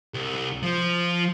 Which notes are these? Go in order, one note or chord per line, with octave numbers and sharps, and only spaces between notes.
C2
F3